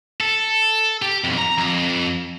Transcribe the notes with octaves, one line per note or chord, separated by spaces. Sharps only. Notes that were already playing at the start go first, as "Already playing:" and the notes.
A4
G4
B1 F2
A#5
F2